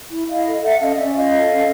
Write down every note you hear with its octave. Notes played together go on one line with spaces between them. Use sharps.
E4
E4 D#5 F5
A4
A4 E5 F#5
C#4 D#5 F5
C#4 D5 E5
F4 D#5 F5
A4
C#4